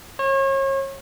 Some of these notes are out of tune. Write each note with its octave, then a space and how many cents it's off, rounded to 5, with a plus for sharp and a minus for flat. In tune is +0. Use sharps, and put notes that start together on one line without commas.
C#5 -35